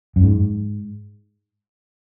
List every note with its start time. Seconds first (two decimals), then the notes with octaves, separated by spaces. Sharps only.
0.16 F#2
0.23 G#2